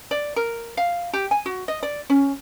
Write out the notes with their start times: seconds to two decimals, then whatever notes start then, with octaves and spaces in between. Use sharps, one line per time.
0.11 D5
0.36 A#4
0.77 F5
1.13 G4
1.31 G#5
1.46 F#4
1.68 D#5
1.83 D5
2.10 C#4